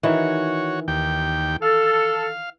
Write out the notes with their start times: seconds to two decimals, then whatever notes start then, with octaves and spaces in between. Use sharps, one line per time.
0.03 D#3 E3 F#4 C#5
0.88 D#2 G4 G5
1.62 A4 F5